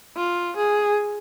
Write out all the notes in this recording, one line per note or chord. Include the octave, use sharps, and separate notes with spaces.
F4
G#4